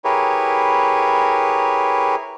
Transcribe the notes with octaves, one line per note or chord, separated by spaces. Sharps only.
E4 G4 G#4 A#4 B4 C#5